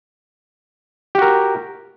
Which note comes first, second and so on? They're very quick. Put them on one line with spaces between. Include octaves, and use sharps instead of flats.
G4 F#4 A#4